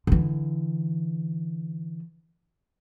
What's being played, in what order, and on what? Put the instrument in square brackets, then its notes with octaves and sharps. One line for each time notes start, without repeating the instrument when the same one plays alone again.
[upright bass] D3 E3